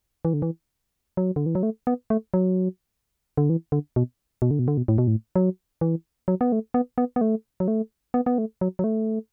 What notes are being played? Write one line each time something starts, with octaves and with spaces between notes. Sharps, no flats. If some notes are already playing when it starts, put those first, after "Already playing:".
E3
D3
E3
F#3
D3
E3
F#3
A3
B3
A3
F#3
D3
E3
D3
B2
B2
D3
B2
D3
B2
A2
B2
A2
F#3
E3
F#3
B3
A3
B3
B3
B3
A3
F#3
A3
B3
B3
A3
F#3
F#3
A3